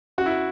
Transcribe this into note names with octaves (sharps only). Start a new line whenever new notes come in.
F#2 F#4
E4